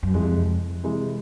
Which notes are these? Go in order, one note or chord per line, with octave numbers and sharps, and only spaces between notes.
F#2
F2 C3 E3 G#3
C3 E3 G#3